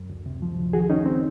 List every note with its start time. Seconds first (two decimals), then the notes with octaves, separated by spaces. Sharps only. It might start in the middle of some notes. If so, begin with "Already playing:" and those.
Already playing: F#2
0.10 D2
0.26 C3
0.42 F3
0.58 D2
0.73 D#3 F#4 G#4
0.90 D#3 C#4 D#4
1.06 C4